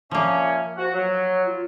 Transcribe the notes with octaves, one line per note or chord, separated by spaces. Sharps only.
A#2 F3 A#3 C#4 E5
F#4 C5
F#3 C#5
F4